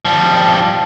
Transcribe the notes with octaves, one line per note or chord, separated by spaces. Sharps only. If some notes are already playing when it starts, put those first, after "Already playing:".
F3 G3